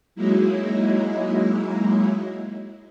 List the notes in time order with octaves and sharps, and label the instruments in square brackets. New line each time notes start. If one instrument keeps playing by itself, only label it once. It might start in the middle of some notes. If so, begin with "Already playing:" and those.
[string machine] F#3 G#3 A#3 D#4 E4